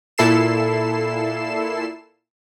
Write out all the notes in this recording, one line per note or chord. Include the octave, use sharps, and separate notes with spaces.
A#2 E4 A4 C7 E7